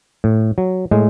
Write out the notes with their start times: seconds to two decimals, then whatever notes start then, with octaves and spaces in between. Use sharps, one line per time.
0.24 A2
0.58 F#3
0.91 A2 G#3